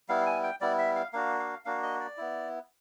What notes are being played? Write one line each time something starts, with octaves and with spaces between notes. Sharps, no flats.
G3 B3 E4 F5
G#5
G5
G3 B3 E4 D5
E5
F5
A#3 D4 F#4 F5
F5
A#3 D4 F#4 F5
D#5
D5
B3 E4